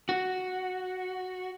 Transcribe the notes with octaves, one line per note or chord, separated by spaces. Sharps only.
F#4